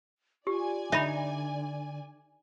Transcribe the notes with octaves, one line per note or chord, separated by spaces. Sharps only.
F4 G4 D5 G#5
D3 D#4 E5 B5